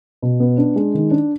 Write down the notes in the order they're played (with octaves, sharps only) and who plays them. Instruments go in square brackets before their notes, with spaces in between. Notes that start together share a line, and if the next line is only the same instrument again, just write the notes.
[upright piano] B2
B3
D4
G#3
D#3
D4